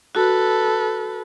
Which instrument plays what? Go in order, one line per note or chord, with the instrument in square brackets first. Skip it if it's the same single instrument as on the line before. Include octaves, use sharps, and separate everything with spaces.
[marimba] F#4 [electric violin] A4 B4